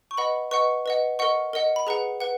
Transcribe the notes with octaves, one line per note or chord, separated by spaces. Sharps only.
C#6
B4 D#5 F#5 B5
B4 D#5 F#5 C#6
B4 D#5 F#5
A#4 D#5 F#5 C#6
A#4 D#5 F#5
B5
G#4 B4 F#5 A#5
B4 F#5